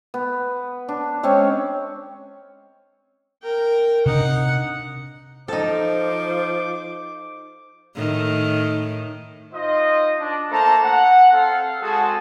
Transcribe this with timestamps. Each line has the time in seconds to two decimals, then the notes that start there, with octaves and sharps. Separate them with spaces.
0.14 B3
0.89 D4
1.23 G#3 C4 C#4 C#5
3.43 A#4 G5
4.06 C3 D4 D#4 F#5
5.48 F3 D#4 A4 C5 D6
7.95 A2 D#3
9.52 D#4 F4 C5 D#5
10.19 D4
10.50 A3 A#3 A4 C5 A5 A#5
10.83 F#5
11.32 C4 A4 F5
11.80 G#3 C4 F#4 G#4 A4 A5